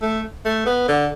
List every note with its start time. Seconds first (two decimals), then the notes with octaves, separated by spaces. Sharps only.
0.02 A3
0.45 A3
0.66 B3
0.88 D3